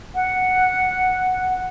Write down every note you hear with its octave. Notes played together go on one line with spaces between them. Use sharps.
F#5